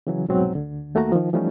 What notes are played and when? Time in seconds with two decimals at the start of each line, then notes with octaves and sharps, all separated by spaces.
0.07 C#3 E3 F#3
0.28 C2 G#2 B2 F#3 C4
0.53 D2 D3
0.95 D#2 A3 A#3 F#4 A#5
1.12 D#3 F3
1.33 E3 F3 G3 A3 C#4 D#4